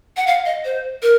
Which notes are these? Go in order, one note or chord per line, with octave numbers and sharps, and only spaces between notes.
F#5
F5
D#5
C5
A#4